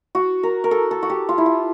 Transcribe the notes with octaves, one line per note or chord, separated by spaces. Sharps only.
F#4
A#4
A#4
A4
A4
F#4
G4
F4
E4
F4